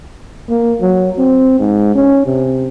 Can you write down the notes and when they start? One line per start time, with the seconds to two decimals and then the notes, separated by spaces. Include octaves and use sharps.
0.50 A#3
0.81 F#3
1.18 C4
1.59 G#2
1.95 C#4
2.26 C3